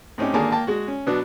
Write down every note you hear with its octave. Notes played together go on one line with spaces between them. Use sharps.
A2 C4 C#4 D#4 G4
G#1 D3 A#3 G#4 G#5 A5
A#3 G5 A5
G#3 F#4
C#4
B2 F#3 B3 D4